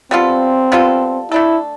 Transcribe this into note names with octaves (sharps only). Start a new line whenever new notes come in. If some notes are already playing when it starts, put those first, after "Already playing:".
G3 B3 C4 F4 A4
G3 B3 F4 A4
A3 D4 E4 A4